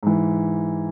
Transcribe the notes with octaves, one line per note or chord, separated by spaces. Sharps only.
G#2 E3